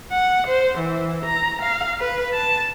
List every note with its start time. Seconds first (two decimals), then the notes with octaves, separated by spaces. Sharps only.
0.11 F#5
0.47 C5
0.78 E3
1.25 A#5
1.62 F5
2.00 B4
2.33 A5